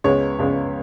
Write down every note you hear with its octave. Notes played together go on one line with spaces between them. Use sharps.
C#2 C#3 G#3 B3 C#5
C#2 C#3 G#3 B3